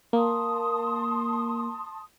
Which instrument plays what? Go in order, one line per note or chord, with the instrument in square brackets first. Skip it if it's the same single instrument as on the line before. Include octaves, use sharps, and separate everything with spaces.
[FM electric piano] A#3 [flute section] A5 C6 D#6